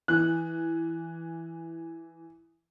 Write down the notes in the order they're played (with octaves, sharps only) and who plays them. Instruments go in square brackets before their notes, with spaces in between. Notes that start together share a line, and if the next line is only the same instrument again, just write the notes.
[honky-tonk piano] E3 [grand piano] F#6